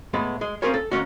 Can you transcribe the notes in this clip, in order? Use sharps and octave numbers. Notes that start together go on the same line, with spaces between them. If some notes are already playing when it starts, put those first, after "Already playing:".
A2 G#3 B3
G#3
C4 C#4 F4 G#4 A#4 C#5
A4
D#2 D#3 C#4 F#4